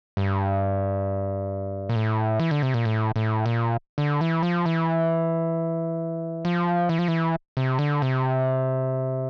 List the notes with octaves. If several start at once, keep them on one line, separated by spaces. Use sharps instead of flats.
G2
A#2
A2
E3
D3
C3
A#2
A2
A2
A#2
D3
E3
F3
E3
F3
E3
F3
E3
C3
D3
C3